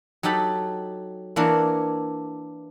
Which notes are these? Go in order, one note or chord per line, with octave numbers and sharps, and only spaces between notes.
F#3 D#4 G4 A4 B5
E3 A#3 D4 E4 A#4 C#5